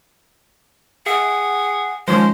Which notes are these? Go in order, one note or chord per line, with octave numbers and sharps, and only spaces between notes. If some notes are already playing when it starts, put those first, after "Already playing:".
G#4 E5 F#5
D#3 F3 G#3 C#4 C5